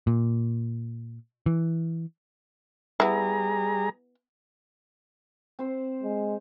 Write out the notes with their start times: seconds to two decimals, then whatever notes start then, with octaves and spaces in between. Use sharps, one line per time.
0.07 A#2
1.46 E3
3.00 G3 B3 E4 G#4 A#5
5.59 C4 C5
6.03 G#3